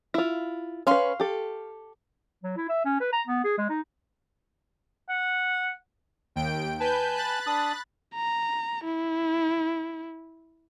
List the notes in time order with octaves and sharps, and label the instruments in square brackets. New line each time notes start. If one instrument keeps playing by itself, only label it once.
[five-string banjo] E4 F4
[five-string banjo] C#4 B4 [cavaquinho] F5 C6 C#6
[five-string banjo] G4 A4
[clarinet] F#3
E4
E5
C#4
B4
A#5
B3
G#4
G#3
D#4
[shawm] F#5
[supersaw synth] D#2 G5 D7
[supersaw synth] B4 G6 [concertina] G#5 A5
[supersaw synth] B5 F#6 A6
[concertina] D4 D#6
[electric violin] A#5
E4